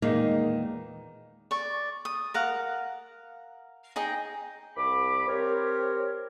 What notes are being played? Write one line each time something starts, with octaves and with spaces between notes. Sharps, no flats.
E2 A#2 D#3 G#3 A#3 D#4
D5 C#6
D#6
A#4 F5 F#5
D#4 G#4 D#5 G5
C2 B5 D6
C4 G4 A#4 C#5